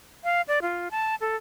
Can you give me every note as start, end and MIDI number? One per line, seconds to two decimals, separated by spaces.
0.24 0.41 77
0.48 0.59 74
0.62 0.88 65
0.91 1.15 81
1.21 1.36 69